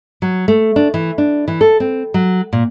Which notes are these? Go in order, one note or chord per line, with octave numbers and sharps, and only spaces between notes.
F#3
A3
D4
E3
D4
E3
A4
C4
F#3
A#2